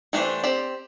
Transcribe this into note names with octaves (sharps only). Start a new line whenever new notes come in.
E3 A3 D4 G4 C5
C4 G4 D5